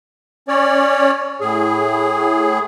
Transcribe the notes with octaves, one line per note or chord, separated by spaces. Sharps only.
C#4 C#5 D5
A2 G#4